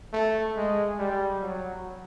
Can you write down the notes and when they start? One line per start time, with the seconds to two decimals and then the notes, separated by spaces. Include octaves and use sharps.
0.13 A3
0.56 G#3
0.99 G3
1.42 F#3